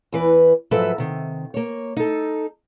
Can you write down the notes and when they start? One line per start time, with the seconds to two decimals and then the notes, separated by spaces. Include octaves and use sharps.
0.12 E2 E3 B4
0.71 G#2 F3 F#3 A4 B4 E5
0.98 C3 D#3
1.54 A#3 C#5
1.97 D#4 A4